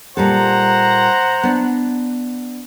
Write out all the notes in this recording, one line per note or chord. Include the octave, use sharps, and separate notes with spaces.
A#2 G3 A4 C5 F#5 A#5
B3 D4